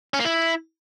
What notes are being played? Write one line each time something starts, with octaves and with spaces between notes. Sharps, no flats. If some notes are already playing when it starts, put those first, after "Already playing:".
C#4
A#3
E4